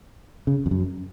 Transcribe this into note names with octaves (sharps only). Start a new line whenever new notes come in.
C#3
F2
F#2